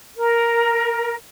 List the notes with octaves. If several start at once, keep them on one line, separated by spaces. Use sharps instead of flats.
A#4